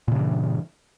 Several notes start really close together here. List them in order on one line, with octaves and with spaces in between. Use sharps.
A#2 C#3 G2 E3